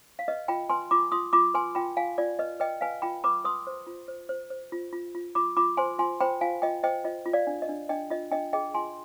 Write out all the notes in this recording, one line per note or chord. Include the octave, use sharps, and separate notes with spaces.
F5
B4 D#5
F4 G5 B5
B4 G#5 C6
F4 B5 D6
F4 C6 D#6
F4 B5 D6
B4 G#5 C6
F4 G5 B5
F4 F5 G#5
F4 D5
B4 D#5
B4 D#5 G5
B4 F5 G#5
F4 G5 B5
B4 B5 D6
B4 C6 D#6
C5
F4
C5
C5
C5
F4
F4
F4
F4 B5 D6
F4 B5 D6
C5 G#5 C6
F4 G#5 C6
C5 G5 B5
F4 F5 G#5
F4 D#5 G5
C5 D#5 G5
F4 D#5
F4
D5 F5
D4
D#5
D4
D4 D#5 G5
F4 D#5
D4 D#5 G5
G#4 D#5 G5
F4 G#5 C6